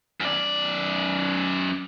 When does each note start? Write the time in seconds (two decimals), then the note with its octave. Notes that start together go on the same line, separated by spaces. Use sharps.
0.20 F#2 D5